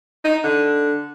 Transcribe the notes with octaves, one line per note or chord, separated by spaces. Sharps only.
D#4
D3